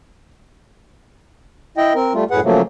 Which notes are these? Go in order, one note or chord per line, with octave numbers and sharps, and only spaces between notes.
E4 D#5 G5
C4 A#4
G3 A3 F4
F#2 A2 G#4 B4 F#5
C#3 F3 F#3 A3 A#3